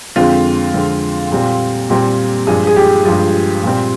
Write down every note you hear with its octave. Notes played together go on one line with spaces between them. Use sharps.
F2 D3 G#3 C4 F4
F2 D3 G#3 C4
A#2 G3 C4
A#2 G3 C4
G2 F3 G#3 G#4
G#4
G4
G2 F3 G#3 F4
A#2 G3 C4